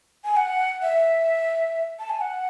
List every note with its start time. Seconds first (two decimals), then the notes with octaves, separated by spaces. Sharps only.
0.25 G#5
0.37 F#5
0.82 E5
1.99 A5
2.10 G#5
2.21 F#5